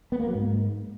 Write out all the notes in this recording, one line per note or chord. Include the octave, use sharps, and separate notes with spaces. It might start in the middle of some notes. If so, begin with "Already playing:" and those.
B3
A#3
F#3
G#2